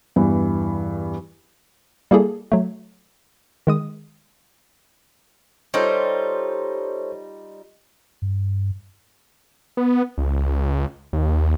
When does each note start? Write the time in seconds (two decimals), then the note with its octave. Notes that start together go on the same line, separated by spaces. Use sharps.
0.16 E2 G2 E3
2.11 G3 A#3 E4 G#4 A4
2.52 F#3 A3
3.67 D#3 G#3 D#6
5.74 G3 D#4 F4 A4 C5 C#5
8.22 G2
9.77 B3
10.18 C#2
11.13 D#2